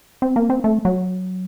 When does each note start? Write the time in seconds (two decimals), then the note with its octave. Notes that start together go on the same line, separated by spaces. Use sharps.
0.22 C4
0.36 A#3
0.50 C4
0.64 A3
0.85 F#3